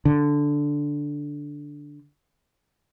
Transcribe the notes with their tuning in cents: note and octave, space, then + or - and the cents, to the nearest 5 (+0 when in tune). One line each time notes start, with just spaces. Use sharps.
D3 -5